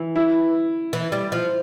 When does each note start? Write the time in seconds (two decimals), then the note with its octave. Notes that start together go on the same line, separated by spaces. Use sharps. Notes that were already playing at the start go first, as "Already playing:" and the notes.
Already playing: E3
0.16 E4
0.93 E3
1.12 G3
1.32 F3